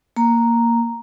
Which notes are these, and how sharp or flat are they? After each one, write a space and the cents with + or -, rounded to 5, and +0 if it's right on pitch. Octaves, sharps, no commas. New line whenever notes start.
A#3 +0 A#5 +0